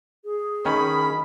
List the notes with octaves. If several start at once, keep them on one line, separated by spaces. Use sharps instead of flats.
G#4
D#3 C#4 B5